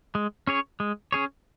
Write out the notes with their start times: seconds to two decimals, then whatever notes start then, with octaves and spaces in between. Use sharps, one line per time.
0.15 G#3
0.47 C#4 G#4 C#5
0.80 G#3
1.12 C#4 G#4 C#5